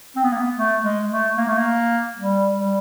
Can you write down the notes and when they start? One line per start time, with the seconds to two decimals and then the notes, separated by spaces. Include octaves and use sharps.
0.16 C4
0.24 B3
0.32 A#3
0.39 B3
0.56 A3
0.83 G#3
1.10 A3
1.37 A#3
1.48 A3
1.58 A#3
2.18 G3
2.58 G3